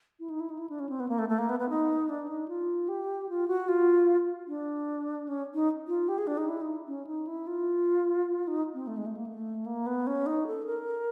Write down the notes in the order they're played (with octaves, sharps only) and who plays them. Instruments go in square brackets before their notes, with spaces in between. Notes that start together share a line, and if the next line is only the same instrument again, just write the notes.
[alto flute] E4
D#4
E4
D#4
E4
D4
C#4
C4
B3
A#3
A3
A3
A#3
B3
B3
D#4
D4
D#4
F4
G4
F4
F#4
F4
D4
C#4
D#4
F4
G4
G#4
D4
D#4
E4
D#4
C#4
D#4
E4
F4
D#4
C4
A3
G#3
A3
A#3
A3
A#3
B3
C#4
D#4
A4
A#4